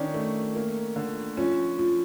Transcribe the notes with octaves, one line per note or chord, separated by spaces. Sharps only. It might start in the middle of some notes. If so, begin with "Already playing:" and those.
Already playing: D#3 C#4 D4
A3
A#3
D3
F3 C#4
F3